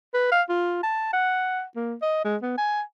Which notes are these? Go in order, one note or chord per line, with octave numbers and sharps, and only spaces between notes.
B4
F5
F4
A5
F#5
A#3
D#5
G#3
B3
G#5